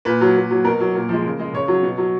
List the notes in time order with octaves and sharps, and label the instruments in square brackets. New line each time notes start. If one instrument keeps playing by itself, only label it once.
[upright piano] A#2 B4
F#3
A#2
F#3
B2 A#4
F#3
A#2
F3 G#3
C#3
G#3
C#3 C#5
F#3
B2
F#3